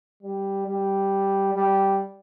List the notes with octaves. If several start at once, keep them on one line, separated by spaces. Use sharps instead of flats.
G3
G3
G3